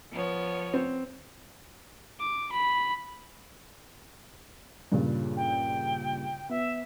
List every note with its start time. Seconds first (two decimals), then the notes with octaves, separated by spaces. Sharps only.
0.11 F3 B3 C#5
0.74 C4
2.20 D6
2.52 B5
4.92 G2 A#2 C#3
5.36 G5
6.49 B3 E5